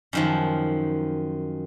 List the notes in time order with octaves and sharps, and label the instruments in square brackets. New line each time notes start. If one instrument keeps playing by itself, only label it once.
[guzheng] F#2 D#3 F3